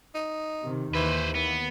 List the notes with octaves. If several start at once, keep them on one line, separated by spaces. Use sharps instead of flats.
D#4
C3 D#3
D#2 E3 B4 C5
E3 B3